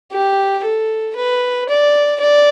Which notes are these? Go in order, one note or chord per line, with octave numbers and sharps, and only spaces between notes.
G4
A4
B4
D5
D5